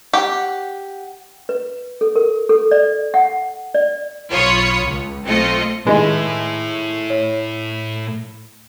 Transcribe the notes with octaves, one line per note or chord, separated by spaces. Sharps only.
G4 F#5
B4
A4
A#4
A4
D5
F#5
D5
B1 F4 C#5 B5 D#6 C#7
C#2
B1 A3 C4 F4 D#5 C#7
A2 D#3 G#3 D#4 E4 D#5
C#5